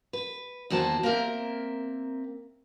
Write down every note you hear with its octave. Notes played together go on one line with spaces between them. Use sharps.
B4
E2 D#3 A#3 F#4 C5 A5
A#3 C4 A#4 E5